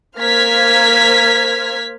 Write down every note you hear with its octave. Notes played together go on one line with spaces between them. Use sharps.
A#3 C5 F6 G#6 B6